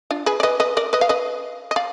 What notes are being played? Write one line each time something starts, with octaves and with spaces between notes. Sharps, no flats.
D4 F4
G#4 B4
D5
B4 D#5
B4 D#5
A#4 D5
B4 D#5
F5
B4 D#5
D#5
D5 F5